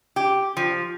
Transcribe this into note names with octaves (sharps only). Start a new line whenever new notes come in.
G4
F3